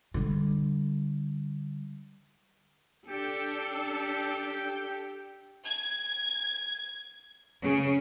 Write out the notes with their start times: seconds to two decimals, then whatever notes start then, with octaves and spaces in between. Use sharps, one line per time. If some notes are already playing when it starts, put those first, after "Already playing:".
0.14 D3 G3
3.09 D4 G4 A4 G5
5.67 G#6
7.62 C#3